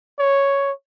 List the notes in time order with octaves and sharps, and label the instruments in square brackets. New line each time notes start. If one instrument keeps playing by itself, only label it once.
[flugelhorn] C#5